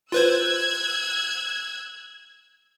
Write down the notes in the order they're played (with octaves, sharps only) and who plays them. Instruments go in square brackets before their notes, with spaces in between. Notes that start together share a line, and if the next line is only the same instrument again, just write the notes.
[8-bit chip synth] F4 B4 C5 [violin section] E6 F#6 G#6